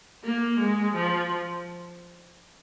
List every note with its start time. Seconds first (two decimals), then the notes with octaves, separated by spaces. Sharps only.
0.24 A#3
0.59 G#3
0.95 F3